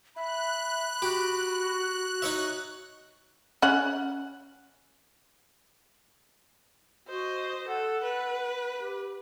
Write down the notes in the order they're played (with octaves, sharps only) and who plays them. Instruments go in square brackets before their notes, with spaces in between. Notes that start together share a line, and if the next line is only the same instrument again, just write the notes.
[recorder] E5 [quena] B5 [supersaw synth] F#6
[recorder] F#4 [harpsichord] G4
[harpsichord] D#4 C#5 E5
[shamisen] C#4 F#5
[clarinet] F#4 [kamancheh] C5 D#5
[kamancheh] A4 [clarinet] F#5
[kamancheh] B4
[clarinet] G4